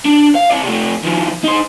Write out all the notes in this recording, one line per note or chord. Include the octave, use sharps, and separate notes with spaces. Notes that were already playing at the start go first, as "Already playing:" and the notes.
D4
F5
C4 D5
C3 A3
D#3 F3
D#4 C5